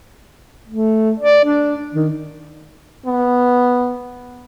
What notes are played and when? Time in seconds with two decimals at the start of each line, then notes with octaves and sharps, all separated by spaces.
0.68 A3
1.20 D5
1.45 D4
1.94 D#3
3.06 B3